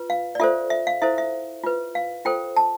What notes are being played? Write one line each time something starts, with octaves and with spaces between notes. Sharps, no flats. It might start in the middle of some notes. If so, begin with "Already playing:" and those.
Already playing: F4 B4
F5
D5
F4 A4 C5 E5
E5
F5
E4 A4 C5 E5
E5
F4 B4
F5
F4 A4 C5 G5
A5